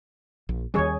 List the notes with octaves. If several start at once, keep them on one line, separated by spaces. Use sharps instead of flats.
A#1
D#2 D#3 G3 C#4 G#4 C#5